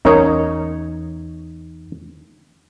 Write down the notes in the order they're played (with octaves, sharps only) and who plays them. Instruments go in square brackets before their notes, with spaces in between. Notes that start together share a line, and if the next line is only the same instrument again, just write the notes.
[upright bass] E2 [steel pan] C#4 A#4 C#5 [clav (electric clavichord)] D#4